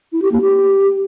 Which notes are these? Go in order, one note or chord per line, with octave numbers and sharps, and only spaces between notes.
E4
G4
A#3
G4